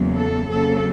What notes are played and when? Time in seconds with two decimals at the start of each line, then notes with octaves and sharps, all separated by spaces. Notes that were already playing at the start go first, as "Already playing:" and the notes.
Already playing: E2 C#3 F#3 A#3
0.15 A4
0.49 F2 C#3 F#3 A#3 A4